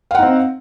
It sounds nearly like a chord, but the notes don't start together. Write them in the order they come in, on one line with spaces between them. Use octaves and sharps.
F5 F#5 D#4 C4